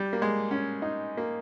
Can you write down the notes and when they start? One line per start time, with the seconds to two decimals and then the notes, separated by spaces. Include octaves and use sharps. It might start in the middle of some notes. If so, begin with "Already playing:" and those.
Already playing: G3
0.13 A#3
0.22 G#3
0.51 C#4
0.82 D#4
1.17 A#3